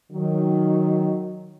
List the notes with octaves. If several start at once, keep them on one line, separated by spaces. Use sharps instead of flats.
D#3 F#3